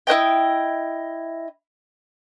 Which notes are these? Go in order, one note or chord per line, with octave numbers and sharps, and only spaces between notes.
E4 C5 D#5 G5